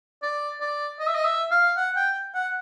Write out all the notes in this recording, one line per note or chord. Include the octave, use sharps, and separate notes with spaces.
D5
D5
D#5
E5
D#5
E5
F5
F#5
G5
F#5